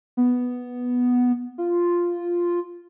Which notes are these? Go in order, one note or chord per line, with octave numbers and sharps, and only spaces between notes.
B3
F4